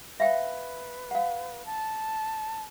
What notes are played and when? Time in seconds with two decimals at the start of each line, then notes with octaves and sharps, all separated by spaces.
0.20 B4 E5 F5 G5
1.11 F5 F#5
1.66 A5